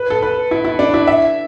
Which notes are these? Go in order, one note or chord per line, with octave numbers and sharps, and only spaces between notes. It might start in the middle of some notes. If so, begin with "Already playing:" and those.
Already playing: B4
A4
B4
E4
E4
D4
E4
E5